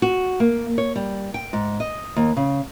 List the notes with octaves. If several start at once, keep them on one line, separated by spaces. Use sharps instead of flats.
F#4
A#3
C#5
G3
G5
G#2
D#5
D#2
C#3